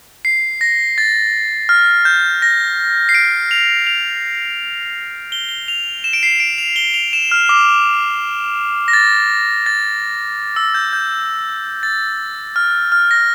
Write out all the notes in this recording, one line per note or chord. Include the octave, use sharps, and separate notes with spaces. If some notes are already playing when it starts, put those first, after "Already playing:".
C7
A#6
A6
F6
G6
A#6
C7
D7
F7
F7
G7
G7
F7
E7
D7
C7
D7
F7
G7
F7
E7
F6
D6
A#6
A6
A6
E6
G6
G6
A6
F6
F6
A#6